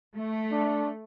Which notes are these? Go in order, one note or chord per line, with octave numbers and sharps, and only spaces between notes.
A3
D4